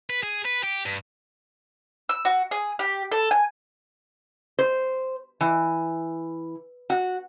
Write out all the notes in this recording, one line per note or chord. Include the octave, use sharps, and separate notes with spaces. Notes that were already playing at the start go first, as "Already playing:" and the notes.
B4
G#4
B4
G4
G2
E6
F#4
G#4
G4
A4
G#5
C5
E3
F#4